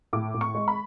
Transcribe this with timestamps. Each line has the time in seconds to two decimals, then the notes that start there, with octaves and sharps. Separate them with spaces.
0.13 A2 D6
0.34 A2
0.41 C#6
0.55 G#3
0.68 B5